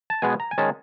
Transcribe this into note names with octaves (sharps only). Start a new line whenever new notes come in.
A5
B2 G#3 B3 G#5
A#5
G#5
D#3 G#3 C#4 A5